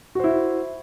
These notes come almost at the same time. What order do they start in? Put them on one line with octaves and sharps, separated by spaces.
F#4 C5 E4